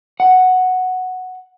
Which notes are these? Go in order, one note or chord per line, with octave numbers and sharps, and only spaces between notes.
F#5